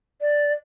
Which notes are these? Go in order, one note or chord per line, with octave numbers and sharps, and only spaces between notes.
D5